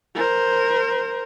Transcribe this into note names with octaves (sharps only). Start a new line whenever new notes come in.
A#4 C5